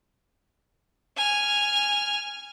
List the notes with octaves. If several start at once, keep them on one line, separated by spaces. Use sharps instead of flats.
G#5 F6